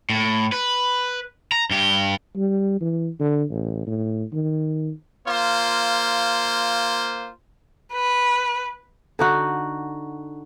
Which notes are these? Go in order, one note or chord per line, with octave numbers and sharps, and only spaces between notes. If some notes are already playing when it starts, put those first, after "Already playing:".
A2
B4
A#5
G2 G4
G3
E3
D3
A1
A2
D#3
A#3 F4 C5
B4
D3 D#4 F#4